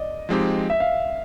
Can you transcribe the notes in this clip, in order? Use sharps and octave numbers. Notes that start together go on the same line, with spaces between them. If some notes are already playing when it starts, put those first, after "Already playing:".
Already playing: D5 D#5
F3 G#3 C4 D#4 G4
E5
F5